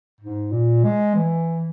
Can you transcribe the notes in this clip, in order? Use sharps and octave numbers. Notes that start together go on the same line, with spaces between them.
G#2
A#2
G#3
E3